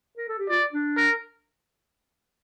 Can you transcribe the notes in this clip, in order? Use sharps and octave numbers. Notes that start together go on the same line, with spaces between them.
A#4
A4
G4
F4 D5
D4
A#4